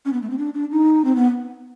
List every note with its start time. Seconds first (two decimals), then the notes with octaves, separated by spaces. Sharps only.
0.05 C#4
0.13 B3
0.22 A3
0.30 C4
0.38 D4
0.54 D4
0.71 D#4
1.05 C4
1.16 B3